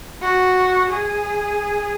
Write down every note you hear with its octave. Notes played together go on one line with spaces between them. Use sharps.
F#4
G#4